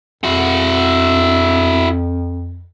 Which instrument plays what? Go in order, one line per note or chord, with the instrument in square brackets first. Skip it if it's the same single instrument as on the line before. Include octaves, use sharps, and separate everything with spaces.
[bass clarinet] F2 [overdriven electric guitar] E4 F#4